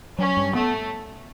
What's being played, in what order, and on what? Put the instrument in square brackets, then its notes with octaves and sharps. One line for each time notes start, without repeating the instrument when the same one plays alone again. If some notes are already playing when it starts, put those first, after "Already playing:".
[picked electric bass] F#3 [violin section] C#4
[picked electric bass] G2
[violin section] A3 [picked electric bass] B3